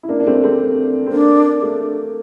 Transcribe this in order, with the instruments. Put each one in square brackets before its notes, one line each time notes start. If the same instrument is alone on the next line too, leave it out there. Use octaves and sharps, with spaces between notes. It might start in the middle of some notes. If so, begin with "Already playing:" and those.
[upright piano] E4
A#3 D4
D4
A3 C4
A3 C4
A3
C4
[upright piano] A#3 [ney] D4
[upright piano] A3